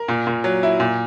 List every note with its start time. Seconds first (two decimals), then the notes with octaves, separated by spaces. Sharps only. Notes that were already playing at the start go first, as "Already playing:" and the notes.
Already playing: A#4
0.08 A#2
0.27 A#2
0.44 F#3
0.63 E4
0.80 A#2